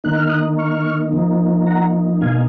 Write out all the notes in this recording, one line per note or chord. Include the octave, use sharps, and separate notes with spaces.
D#3 A#3 D#4 F#6
F6
D#6 F#6
C#6 F6
F3 A#3 D#4
F#5 A#5
B2 A#3 D#4 F5 G#5